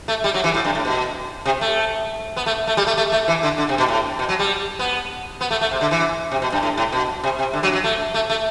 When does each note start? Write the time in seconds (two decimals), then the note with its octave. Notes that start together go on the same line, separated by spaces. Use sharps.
0.08 A3
0.24 G3
0.34 F#3
0.44 E3
0.54 A2
0.65 G2
0.75 A2
0.85 B2
1.46 C3
1.61 A3
2.37 B3
2.46 A3
2.67 A3
2.77 G3
2.87 A3
2.97 A3
3.12 A3
3.28 E3
3.43 D3
3.58 D3
3.69 C3
3.78 B2
3.88 A2
4.19 B2
4.29 F#3
4.39 G3
4.79 B3
5.41 B3
5.51 A3
5.61 A3
5.71 C3
5.81 D3
5.91 E3
6.32 C3
6.42 B2
6.52 G2
6.63 A2
6.78 A2
6.92 B2
7.23 C3
7.39 C3
7.53 D3
7.63 F#3
7.73 F#3
7.84 A3
8.14 A3
8.29 A3